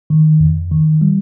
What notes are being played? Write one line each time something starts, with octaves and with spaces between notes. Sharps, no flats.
D#3
F2
D#3
G3